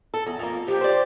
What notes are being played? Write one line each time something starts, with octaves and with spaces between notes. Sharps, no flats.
A4
E2
F2 A#3
F3 G4
C5 D5